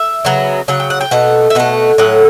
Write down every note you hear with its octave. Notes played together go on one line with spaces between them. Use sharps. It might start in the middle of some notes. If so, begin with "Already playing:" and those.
Already playing: E5
C#3 F#3 B3
C#3 F#3 F#5
G5
F#5
G5
B2 A3 F#5
E5
B2 A3 F#5
A2 F#3 F#5